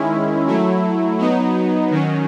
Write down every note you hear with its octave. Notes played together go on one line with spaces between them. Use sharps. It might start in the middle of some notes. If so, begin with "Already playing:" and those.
Already playing: D#3 G#3 C#4 E4
F#3 A3 E4
F#3 B3 D#4
D#3 F#3 C#4